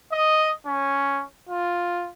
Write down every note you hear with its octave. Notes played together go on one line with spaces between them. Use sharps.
D#5
C#4
F4